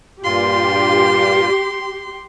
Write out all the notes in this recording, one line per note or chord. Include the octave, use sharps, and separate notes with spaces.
G2 A#2 F4 G4 C6